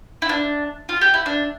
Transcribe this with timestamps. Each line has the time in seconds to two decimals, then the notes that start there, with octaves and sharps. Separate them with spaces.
0.22 E4
0.29 D4
0.89 F4
1.01 G4
1.14 E4
1.26 D4